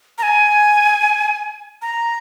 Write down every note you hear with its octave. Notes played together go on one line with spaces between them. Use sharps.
A#5
G#5
A#5